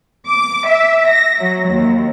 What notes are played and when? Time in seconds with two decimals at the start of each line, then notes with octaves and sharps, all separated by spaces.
0.27 D6
0.68 E5
1.10 A#6
1.40 F#3
1.69 D#2